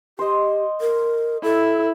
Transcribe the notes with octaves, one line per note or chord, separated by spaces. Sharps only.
G4 C5 D#5
A#4
E4 A4